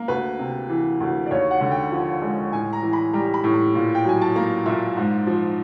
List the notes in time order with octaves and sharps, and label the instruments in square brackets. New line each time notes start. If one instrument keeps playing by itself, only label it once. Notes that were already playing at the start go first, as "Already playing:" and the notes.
Already playing: [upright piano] A#3
D2 B4
C3
E3
D2
D5
D#2 C#5
F#5
D3
G5
F3
G#3
A2 G#5
A#5
E3
B5
G3 A#5
B5
A2
B5
A#2
G5
F#3 G#5
A5
A#3 A#5
A#2 E5
G#2
F3